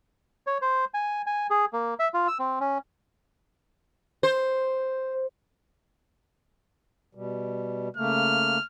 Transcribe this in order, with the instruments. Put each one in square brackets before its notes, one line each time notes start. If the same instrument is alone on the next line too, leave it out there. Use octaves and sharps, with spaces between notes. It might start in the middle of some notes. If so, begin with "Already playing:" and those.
[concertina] C#5
C5
G#5
G#5
G#4
A#3
E5
F4
E6
C4
C#4
[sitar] C5
[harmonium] B2 G3
[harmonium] C#3 A3 A#3 [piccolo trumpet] F6